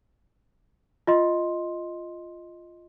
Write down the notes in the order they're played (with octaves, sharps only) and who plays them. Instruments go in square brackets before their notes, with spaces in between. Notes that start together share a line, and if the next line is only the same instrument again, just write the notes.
[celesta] F4 D#5 C6